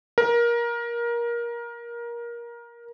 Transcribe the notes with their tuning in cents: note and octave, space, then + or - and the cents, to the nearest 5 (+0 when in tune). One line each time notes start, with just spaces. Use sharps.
A#4 +20